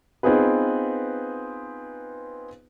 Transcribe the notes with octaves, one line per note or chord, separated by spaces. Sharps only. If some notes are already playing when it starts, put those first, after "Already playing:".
B3 C4 D#4 F4 G#4 B4